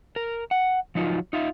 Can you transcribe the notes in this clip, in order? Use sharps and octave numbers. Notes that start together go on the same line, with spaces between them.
A#4
F#5
F3 F#3 D#4 F4
D#4 F4 E5